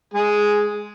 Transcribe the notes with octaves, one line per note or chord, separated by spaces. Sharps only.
G#3 G#4